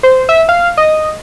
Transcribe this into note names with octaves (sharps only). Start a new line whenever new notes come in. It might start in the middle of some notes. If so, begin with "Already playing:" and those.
C5
E5
F5
D#5